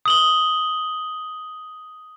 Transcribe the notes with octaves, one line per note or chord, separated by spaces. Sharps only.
D#6 F#7 G7